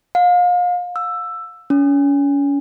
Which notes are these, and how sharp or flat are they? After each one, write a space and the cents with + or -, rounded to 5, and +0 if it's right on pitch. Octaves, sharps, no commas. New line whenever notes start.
F5 +35
E6 +10
C#4 +35